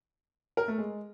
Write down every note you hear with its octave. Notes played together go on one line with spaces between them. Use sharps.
A#4
A3
G#3